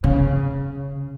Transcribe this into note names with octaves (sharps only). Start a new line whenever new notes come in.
C#3